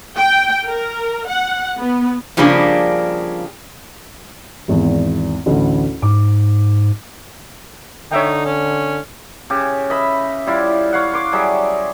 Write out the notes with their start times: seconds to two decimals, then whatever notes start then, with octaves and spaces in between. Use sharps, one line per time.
0.17 G5
0.66 A#4
1.28 F#5
1.79 B3
2.37 C#3 F3 G3 A#3 D4 G#4
4.68 G#1 E2
5.46 A1 D2
6.02 G#2 D6
8.12 D3 D#4 C#5 E5 G5
8.45 C#4
9.50 C#3 G4
9.90 D#5 E5 B5
10.47 G3 E4 F4
10.93 C#5 F5 F#5
11.13 C6 D6
11.32 F#3 G3 G#4 E5